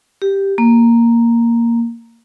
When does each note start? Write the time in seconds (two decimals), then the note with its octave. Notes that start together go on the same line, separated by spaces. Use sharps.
0.22 G4
0.58 A#3